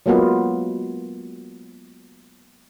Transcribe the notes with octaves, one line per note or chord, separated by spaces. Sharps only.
F#3 G#3 A#3 B3 F4